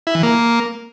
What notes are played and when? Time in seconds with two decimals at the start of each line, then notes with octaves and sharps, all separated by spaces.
0.07 E4
0.15 E3
0.23 A#3